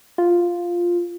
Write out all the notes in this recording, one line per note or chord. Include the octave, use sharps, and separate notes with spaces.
F4